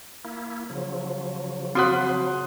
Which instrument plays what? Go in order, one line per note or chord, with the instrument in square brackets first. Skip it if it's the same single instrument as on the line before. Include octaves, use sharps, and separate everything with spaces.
[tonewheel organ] A#3 E4
C#3 F3 F#3
[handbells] C4 F#4 F#5 [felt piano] C6 D#6 F#6